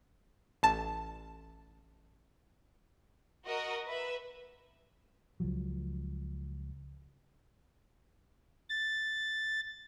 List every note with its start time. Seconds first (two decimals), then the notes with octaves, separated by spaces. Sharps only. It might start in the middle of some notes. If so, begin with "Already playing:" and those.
0.63 A1 A5
3.45 F#4 A#4 D#5
3.86 B4 E5
5.40 C#2 F3 F#3
8.69 A6